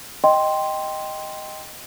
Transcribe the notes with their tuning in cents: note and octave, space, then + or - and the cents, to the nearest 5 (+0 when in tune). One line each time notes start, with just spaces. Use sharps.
D#5 +0 G5 +0 C6 +0